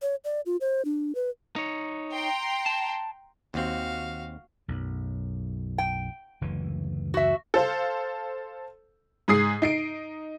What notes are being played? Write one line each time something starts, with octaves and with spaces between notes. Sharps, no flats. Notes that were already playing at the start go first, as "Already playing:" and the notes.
C#5
D5
F4
C5
D4
B4
D#4 C#5
G5 A#5 C6
A5
D#2 C4 F#4 F5
B1 F#2
G5
F#1 D2 E3
F#4 E5
A4 C5 F5
G#2 G#4 D#6 C7
D#4 C7 D7